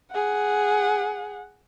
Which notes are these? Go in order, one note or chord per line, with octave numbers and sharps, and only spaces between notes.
G#4 F#5